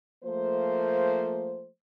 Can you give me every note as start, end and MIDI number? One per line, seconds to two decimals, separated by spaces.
0.23 1.67 53
0.23 1.67 57
0.23 1.67 58
0.23 1.67 72